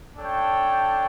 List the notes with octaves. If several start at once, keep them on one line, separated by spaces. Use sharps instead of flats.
D4 A4 C#5 G5